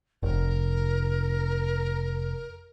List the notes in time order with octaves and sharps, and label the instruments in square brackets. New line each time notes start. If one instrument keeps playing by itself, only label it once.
[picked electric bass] F1 [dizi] A#4